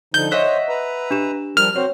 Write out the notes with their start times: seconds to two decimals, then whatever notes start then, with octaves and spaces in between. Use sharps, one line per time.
0.14 D3 F3 D#4 G6
0.31 C5 C#5 D#5 E5 F#5
0.69 B4 A#5
1.11 D4 G4 E7
1.57 F3 G3 A#4 F6
1.76 C4 F#4 C5 C#5